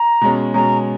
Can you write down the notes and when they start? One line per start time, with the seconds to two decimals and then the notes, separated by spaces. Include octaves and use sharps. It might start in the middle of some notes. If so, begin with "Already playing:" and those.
Already playing: A#5
0.21 B2 G#3 C#4
0.54 B2 G#3 C#4 A#5